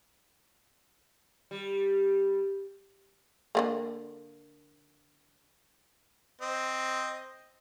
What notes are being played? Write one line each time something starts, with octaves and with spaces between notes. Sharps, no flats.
G3
D3 A3 A#3
C4 D#5